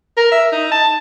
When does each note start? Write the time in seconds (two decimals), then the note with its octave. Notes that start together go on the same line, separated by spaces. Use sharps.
0.17 A#4
0.32 E5
0.52 D#4
0.71 A5